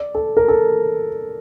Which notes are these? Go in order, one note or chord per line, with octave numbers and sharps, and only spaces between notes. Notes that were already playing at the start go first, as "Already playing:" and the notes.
Already playing: D5
A4
A#4
A4